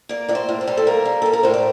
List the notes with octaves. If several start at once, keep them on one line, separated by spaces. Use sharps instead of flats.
A#3 D5
A2 D5
C5
A2
C5
G3
A4
A#3 A#4
G3
G3 A4
A#4
A2 C5
D5